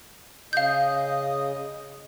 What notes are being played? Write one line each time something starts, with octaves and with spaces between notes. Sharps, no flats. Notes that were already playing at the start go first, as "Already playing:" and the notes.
C#3 D#5 F5 G6